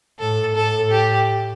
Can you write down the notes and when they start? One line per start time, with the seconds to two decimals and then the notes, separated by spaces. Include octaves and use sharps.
0.19 A2 A4
0.55 A2 A4
0.91 G4